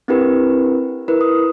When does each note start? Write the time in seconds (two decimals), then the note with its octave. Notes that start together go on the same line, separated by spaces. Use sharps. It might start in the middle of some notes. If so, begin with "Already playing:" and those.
0.08 C4 D4 E4 G4 A#4 B4
1.08 E4 A#4 B4
1.21 D#6